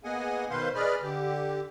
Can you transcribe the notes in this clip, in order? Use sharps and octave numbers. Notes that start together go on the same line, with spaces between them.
A#3 B3 G#4 D#5 F#5 G#5
B2 D#3 B4 C5 F5 C6
G#4 B4 D5 D#5 B5 F6
D3 G4